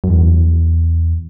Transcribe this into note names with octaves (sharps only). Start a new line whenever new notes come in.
F#2
E2